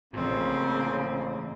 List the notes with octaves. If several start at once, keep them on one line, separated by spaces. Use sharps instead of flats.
A1 G#2 C#3 F3 A#3 C4